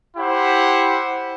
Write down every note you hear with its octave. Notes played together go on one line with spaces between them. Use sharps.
E4 G4 C5 F#5